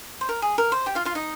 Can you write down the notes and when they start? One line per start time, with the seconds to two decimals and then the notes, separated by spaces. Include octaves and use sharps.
0.21 C5
0.29 A#4
0.42 G#4
0.58 A#4
0.72 C5
0.86 G4 G5
0.95 F4 F5
1.05 F4 F5
1.15 D#4 D#5